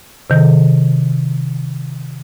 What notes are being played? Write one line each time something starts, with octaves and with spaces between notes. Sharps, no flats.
C3 D#3